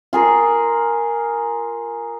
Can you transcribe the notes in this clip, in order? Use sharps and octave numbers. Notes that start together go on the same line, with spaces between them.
F4 G#4 A#4